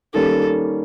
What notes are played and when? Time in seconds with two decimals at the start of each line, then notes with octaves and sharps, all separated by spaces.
0.14 D#3 G3 A#3 C#4 A4